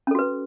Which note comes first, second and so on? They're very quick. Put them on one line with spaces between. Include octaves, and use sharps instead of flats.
C#4 A4 F#4 B4